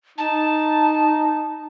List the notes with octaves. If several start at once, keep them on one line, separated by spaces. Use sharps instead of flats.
D#4 A5